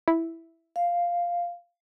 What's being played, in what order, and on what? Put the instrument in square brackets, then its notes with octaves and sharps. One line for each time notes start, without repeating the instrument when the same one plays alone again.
[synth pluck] E4
[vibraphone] F5